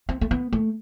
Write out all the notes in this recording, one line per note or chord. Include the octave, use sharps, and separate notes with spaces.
C4
A3
B3
A3